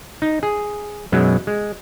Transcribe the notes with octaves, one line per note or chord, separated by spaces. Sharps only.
D#4
G#4
F#2 B2 F#3 G#3
G#3